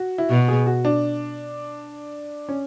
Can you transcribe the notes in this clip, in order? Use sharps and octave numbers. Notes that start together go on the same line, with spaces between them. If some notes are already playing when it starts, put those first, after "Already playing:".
Already playing: F#4
E4
B2 F#4
G#4
F#4
D4
C#4